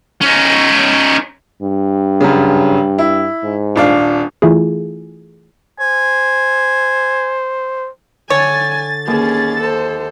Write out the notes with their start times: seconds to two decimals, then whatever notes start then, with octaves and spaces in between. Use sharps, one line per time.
0.21 C#4 D#4
1.63 G2
2.21 F#2 C#3
2.98 E4
3.43 G#2
3.76 D#1 D4 F5
4.42 E3 A3 E4 F4 G#4
5.80 C5 G#5
8.30 D3 C#5 G#5 A6
9.07 D#2 C#4 G#4
9.61 A4 C5